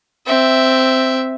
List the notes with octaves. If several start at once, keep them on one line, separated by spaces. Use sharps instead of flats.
C4 E5